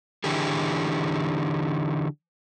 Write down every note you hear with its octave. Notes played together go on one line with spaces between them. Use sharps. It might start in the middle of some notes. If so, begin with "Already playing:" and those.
D3 E3 G4 G#4